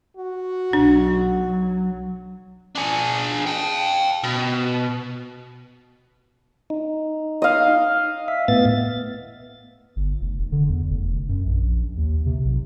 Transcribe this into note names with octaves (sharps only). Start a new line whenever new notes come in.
F#4
B1 F#3 D4
F#3
D4 G#4
F5 G5
B2
D#4
D#5 F5
E5
A2 B3 A6
G1
F1
F1
D3
E2
F1
F#2
A#1
D#2
C3
B1